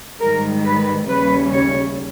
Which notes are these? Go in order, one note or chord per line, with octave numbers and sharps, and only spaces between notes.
G#2 D#3 G3 A#4
B4
D#2 C#3 G3 C#4 B4
C#5